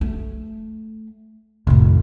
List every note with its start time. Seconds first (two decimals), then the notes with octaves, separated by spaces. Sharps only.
0.01 A3
1.67 F1 A2 D#3